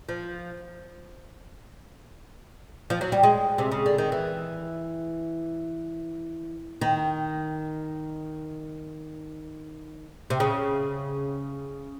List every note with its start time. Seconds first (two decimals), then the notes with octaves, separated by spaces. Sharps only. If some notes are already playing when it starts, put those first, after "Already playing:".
0.09 F3
2.90 F3
3.01 F#3
3.12 G3
3.23 G#3
3.58 C3
3.72 C#3
3.86 D3
3.98 D#3
4.12 E3
6.81 D#3
10.30 C3
10.40 C#3